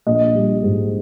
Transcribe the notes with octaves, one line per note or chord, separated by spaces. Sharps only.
A#1 D#5
G3
G#2